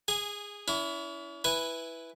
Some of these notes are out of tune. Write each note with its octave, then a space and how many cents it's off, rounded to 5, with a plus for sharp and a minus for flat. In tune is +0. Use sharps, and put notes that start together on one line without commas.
G#4 -15 G#5 +0
C#4 +40 E4 +5
E4 +0 B4 +0 G#5 +0